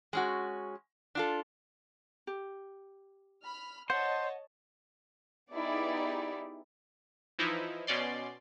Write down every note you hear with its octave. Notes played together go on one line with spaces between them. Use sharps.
G#3 C#4 F#4
D4 F4 A4
G4
B5 F6
C5 C#5 D#5 F#5 A5
B3 D#4 E4 G4 G#4 D5
E3 F3 D#4 E4
B2 C#4 D5 C6